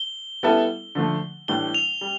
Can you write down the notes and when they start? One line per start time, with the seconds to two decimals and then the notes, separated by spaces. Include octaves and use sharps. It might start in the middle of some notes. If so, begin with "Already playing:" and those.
Already playing: G7
0.43 G3 B3 E4 A4
0.95 D3 F3 A3
1.48 A2 E3 G3 D4 G7
1.74 F7
2.01 G3